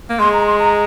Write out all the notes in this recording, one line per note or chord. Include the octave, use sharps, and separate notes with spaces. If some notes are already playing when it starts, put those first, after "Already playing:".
A#3
G#3 C6
A#5
C6
A#5